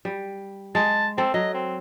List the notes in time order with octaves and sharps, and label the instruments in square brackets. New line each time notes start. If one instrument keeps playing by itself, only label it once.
[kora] G3
[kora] G#3 [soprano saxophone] A5
[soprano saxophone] C4 [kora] A4
[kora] F#3 [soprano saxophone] D#5
[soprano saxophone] C4